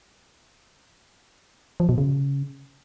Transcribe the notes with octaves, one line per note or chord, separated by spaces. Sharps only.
F3
B2
C#3